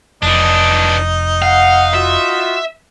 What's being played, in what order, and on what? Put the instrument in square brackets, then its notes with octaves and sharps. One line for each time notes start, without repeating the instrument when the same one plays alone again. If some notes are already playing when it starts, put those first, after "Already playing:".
[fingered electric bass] F1 [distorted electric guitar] E3 D4 [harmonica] D#4
[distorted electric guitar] F5 [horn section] F#5
[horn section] F4 F#4 [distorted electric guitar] E5